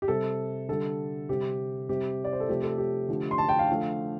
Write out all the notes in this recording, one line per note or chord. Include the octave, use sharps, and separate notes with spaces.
G4
C3 G3 A4
D3 G3 A4
C3 G3 G4
C3 G3 G4
D5
C5
A4
C3 F3 A3 G4
A4
G4
D3 F3 A3
C6
A5
G5
F5
D3 F3 A3